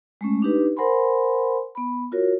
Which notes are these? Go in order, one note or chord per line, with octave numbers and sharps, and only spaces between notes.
G#3 A3 C#4
D4 D#4 G4 B4
A#4 C5 F#5 G#5 B5 C6
B3 B5
F4 F#4 A#4 C#5